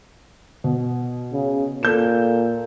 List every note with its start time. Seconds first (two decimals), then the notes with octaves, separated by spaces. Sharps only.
0.64 B2
1.33 C#3
1.83 A#2 A4 G6 E7